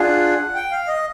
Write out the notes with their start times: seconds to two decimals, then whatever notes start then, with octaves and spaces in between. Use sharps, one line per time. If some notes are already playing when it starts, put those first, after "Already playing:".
Already playing: D4 F4 G#4 F#5
0.55 G5
0.71 F5
0.88 D#5